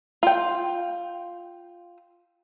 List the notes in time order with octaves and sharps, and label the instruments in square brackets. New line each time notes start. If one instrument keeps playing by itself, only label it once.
[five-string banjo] F4 G5